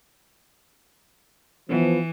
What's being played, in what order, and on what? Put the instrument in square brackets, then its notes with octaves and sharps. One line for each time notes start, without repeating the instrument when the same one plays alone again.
[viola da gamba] E3 [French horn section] F3 B3